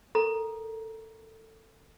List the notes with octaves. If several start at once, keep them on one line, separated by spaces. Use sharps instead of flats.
A4 A#4 A#5